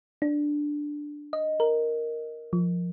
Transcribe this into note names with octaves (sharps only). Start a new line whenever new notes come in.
D4
D#5
A#4
F3